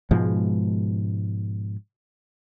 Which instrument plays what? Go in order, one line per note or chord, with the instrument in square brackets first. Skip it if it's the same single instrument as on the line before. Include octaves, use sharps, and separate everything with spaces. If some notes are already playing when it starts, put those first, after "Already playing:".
[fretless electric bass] G#2 B2 F3 G#3